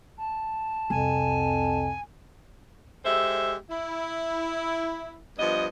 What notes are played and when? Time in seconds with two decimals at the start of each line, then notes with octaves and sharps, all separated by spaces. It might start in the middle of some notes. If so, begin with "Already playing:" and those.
0.17 A5
0.90 C2 F2 G#5
3.05 G#3 G4 A4 C5 E5
3.70 E4
5.39 G2 F3 B3 D#5